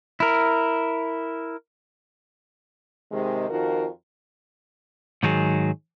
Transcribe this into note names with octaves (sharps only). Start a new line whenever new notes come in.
E4 A#4
C3 D#3 G#3
F2 D#3 F4 F#4 A#4
G#2 D#3 F#3 G#4